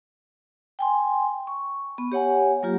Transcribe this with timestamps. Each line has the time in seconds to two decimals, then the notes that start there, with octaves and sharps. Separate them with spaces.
0.79 G5 G#5 C6
1.47 C#6
1.98 B3
2.12 G4 C#5 F#5 G#5
2.63 F#3 A#3 F4 G4